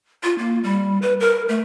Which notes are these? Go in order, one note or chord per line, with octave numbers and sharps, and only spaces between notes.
F4
A#3
G3
B4
A#4
A3